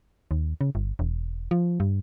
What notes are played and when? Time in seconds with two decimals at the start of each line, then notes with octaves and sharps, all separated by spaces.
0.31 D#2
0.61 C#3
0.75 G1
0.99 E1
1.51 F3
1.80 G2